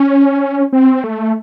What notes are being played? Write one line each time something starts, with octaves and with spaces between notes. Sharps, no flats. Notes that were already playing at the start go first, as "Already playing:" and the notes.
Already playing: C#4
C4
A3